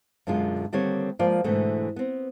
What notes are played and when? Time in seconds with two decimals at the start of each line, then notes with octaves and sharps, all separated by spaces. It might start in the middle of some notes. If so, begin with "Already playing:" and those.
0.27 F#2 B2 D3 G#3 F4
0.72 D3 D#3 G3 A#3 C4 C#5
1.19 F3 G#3 A#3 F4 D5
1.44 G#2 B2 D3 E3 A3
1.96 B3 C4